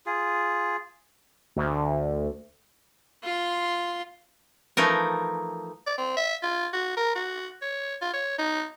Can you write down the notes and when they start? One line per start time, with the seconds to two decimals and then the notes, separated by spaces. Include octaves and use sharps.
0.06 F4 G#4
1.56 D2
3.23 F4 C6
4.77 E3 F3 A3 D#4 A#4
5.87 D5
5.98 C4
6.17 E5
6.43 F4
6.73 F#4
6.96 A#4
7.15 F#4
7.62 C#5
8.02 F4
8.13 C#5
8.39 D#4